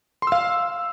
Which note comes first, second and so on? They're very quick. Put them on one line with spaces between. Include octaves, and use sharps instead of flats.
C6 E6 F5